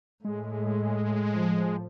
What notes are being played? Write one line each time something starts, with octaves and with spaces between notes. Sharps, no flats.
A2 G#3
F3